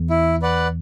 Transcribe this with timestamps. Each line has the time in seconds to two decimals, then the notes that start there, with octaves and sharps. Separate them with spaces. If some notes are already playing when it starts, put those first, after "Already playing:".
Already playing: E2
0.10 E4
0.42 B4 D5 F#5